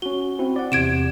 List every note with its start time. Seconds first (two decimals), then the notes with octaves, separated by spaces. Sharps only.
0.02 C#4 F#4 G7
0.39 C4 E4 F#4
0.56 D5 F#5
0.72 E2 C3 G#6 D7 E7